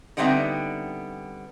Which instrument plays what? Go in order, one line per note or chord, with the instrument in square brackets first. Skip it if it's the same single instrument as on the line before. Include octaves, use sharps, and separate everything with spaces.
[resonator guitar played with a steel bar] D3 G3 B3 C4 D#4 E5